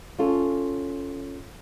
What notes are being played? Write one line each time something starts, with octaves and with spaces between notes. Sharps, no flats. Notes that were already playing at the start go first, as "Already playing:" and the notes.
C#4 F4 A4